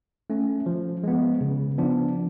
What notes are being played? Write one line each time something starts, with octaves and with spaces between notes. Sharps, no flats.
A3 C#4
F3
G#3 B3
C#3
F3 B3 D4